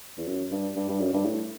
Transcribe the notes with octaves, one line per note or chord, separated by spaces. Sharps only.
E2
F#2
G2
G2
G2
F#2
G2
A2